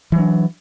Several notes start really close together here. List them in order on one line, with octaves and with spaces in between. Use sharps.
E3 F#3 D4